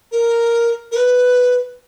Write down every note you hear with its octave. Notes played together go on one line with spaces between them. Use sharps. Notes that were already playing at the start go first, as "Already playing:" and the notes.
A#4
A#4
B4